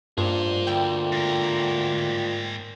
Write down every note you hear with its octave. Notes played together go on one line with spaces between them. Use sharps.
G2 A#2 G#4 C5
D2 G5
G#2 A#4